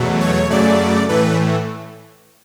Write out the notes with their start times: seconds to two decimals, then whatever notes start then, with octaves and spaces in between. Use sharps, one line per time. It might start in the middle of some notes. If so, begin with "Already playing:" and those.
Already playing: E2 B2 F#3 A3
0.21 C#5
0.50 F#2 C#3 F#3 A3 D5
1.09 A2 E3 A3 B4